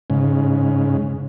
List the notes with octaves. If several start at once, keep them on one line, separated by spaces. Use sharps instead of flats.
G#2 C#3